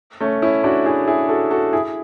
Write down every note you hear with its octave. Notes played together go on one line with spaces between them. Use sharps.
A3 C#4
C#4 E4
D4 F#4
E4 G#4
E4 G#4
F#4 A4
F#4 A4
E4 G#4